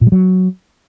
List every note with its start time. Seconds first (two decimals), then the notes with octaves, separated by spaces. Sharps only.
0.01 A#2
0.07 G3
0.12 F#3